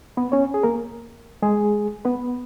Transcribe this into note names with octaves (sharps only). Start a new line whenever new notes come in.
B3 B4
C#4 C#5
G#4
A#3 A#4
G#3 G#4
B3 B4